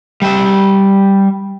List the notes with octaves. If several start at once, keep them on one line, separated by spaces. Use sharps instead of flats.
G3 E5